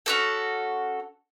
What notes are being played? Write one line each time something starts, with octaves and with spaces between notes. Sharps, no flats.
C#4 F#4 A4